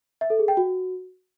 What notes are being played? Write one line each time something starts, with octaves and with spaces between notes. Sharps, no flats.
E5
A4
G#4
G5
F#4